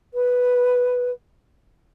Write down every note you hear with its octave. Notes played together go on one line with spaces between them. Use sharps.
B4